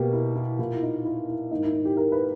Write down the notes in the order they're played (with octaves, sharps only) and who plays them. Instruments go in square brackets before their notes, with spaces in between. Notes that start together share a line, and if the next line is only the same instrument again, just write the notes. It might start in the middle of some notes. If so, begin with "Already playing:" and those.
Already playing: [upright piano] B2 A#3 G4
E4
E4
A#2 A#3 E4
E4
D#4
E4
E4
G#2 D#3 A#3 D#4
E4
E4
G4
A#4
B4